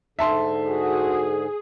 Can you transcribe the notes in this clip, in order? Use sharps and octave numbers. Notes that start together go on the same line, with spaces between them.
G#2 D3 E5 A5 C6
F#4 G#4